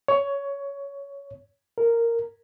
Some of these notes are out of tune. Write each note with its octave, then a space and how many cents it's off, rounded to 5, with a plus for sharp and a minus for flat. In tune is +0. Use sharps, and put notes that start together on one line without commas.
C#5 +15
A#4 -10